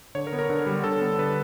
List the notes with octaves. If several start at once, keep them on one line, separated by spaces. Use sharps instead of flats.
D3 C#5
A#4
B3
A#4
D3
G3
D3 A4
B3
D3 B4